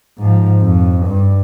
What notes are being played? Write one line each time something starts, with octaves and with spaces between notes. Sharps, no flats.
G#2 F3
F2
G2